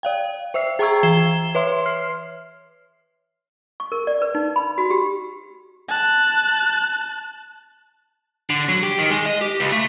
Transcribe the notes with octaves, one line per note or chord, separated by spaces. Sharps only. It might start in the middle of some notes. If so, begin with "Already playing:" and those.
D5 F5 G5
C5 E5 E6 C7
G#4 G5 A#5 C#6 E6 G#6
E3 G#6 C7 E7 G7
B4 C#5 E5 C6
F6 C7
C#6
A#4
D5
B4
D#4
B5
F#4
G4
A5 F#6
D3
F#3
G4
D#3
G#3
D#5
G4
C#2
A3